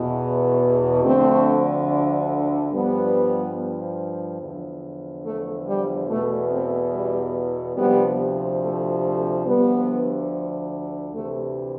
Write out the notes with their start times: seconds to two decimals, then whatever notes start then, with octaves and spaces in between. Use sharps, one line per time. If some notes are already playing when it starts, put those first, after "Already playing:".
Already playing: E2 B2
1.03 D2 D3 F3 A3 C4
2.71 G2 F3 G3 B3
4.41 E2 D3 F3
5.24 A3
5.66 G3
6.08 E2 B2 A3
6.51 A3 C4
6.93 G3
7.77 D2 C3 F3 G3 B3
8.61 A3
9.03 A3
9.45 D2 D3 F3 G3 B3
11.13 D2 C3 E3 A3